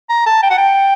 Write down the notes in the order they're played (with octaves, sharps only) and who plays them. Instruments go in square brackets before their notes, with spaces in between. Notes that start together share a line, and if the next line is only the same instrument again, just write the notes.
[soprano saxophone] A#5
A5
G5
F#5
G5